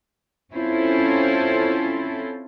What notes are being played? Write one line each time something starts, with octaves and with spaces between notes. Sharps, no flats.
C4 C#4 E4 F4 A4 C5